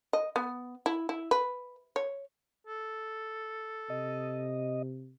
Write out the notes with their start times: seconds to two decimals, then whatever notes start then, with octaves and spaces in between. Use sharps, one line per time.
0.13 D#5
0.36 B3
0.86 E4
1.09 E4
1.31 B4
1.96 C#5
2.67 A4
3.90 C3 D#5